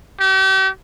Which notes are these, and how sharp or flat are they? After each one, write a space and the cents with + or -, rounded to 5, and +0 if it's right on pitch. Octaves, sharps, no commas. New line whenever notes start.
G4 -40